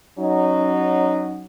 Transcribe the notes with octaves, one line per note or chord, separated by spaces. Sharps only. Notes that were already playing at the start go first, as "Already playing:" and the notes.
F#3 C#4 D#4